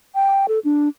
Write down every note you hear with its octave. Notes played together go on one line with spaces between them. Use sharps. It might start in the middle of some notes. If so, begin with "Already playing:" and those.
G5
A4
D4